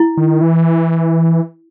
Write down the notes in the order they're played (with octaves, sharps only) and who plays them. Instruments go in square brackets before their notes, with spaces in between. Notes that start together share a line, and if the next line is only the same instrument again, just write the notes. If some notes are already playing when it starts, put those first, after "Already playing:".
Already playing: [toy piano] E4
[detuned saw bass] D#3
E3